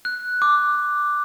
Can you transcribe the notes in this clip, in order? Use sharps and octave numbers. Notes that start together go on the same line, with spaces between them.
F#6
D6